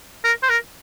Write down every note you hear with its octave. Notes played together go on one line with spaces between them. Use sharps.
A#4
C5
A#4